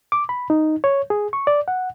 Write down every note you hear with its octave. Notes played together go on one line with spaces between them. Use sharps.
D6
B5
D#4
C#5
G#4
C#6
D5
F#5